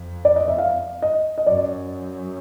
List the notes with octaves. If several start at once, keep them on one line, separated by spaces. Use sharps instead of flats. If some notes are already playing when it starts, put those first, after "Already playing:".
Already playing: F2
D5
D#5
E5
F5
D#5
D#5
F#2 D5